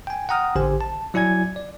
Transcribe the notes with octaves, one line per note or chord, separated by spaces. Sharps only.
G5 G#5
F#5 G5 A#5 D#6 F6
A1 D3 G4 C5 G#5
A5
F#3 E4 D5 G#5 G#6
D5